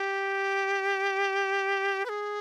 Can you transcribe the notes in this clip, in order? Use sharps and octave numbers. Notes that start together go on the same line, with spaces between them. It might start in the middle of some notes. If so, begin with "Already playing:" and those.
Already playing: G4
B4
G#4